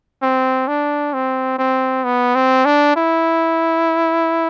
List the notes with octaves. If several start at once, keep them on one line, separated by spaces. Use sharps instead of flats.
C4
D4
C4
C4
B3
C4
D4
E4